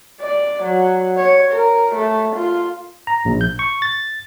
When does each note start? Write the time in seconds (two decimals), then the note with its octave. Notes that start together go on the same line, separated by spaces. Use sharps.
0.21 D5
0.63 F#3
1.17 C#5
1.51 A#4
1.95 A3
2.36 F4
3.07 A#5
3.25 A#1
3.41 G6
3.59 C#6
3.82 A6